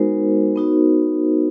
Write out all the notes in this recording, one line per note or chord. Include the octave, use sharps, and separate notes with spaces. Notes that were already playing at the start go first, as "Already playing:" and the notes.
Already playing: G#3 B3 D#4 F#4 A#4 C5
B3 D#4 F#4